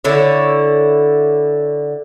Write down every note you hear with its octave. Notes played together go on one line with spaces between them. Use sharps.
D3 E4 C#5